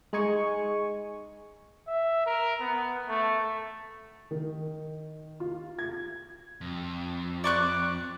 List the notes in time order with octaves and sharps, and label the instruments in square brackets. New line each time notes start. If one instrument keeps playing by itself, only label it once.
[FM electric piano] G#3 D#4 G#5 C#6
[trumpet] E5
A#4
B3
A3
[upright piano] D#3
F4
G#6
[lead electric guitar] F2
[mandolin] D5 C#6 F#6